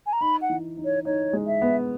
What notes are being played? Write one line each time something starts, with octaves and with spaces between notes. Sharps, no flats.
G#5
A#5
D#4 B5
F#5
E3
D#4
C#5
D#4 C#5
G#3
E5
B3